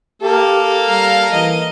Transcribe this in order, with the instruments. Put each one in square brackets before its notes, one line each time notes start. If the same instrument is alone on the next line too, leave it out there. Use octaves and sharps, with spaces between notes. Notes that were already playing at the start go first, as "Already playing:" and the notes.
[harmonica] A#3 [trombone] G4 [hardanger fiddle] A4
[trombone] G3 [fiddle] F5 A#5
[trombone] E3 [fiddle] D#5